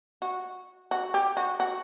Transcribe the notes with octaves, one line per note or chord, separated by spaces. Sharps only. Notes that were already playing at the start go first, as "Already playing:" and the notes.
F#4
F#4
G4
F#4
F#4